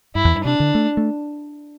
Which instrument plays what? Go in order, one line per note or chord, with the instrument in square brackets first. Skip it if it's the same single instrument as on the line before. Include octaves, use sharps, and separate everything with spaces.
[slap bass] G2 [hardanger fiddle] E4
[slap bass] E2
G2
[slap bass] C3 [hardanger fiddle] D4
[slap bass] D3
A3
A3